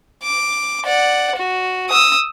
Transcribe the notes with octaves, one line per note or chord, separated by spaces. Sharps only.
D6
D5 F#5
F#4
D#6 E6